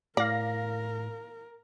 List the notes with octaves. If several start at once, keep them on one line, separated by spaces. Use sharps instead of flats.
A2 A#4 D5 F5 A#6